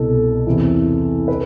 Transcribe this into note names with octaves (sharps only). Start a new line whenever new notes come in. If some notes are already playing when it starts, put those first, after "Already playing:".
Already playing: C2 B2 A4
E2 C3 E3
B4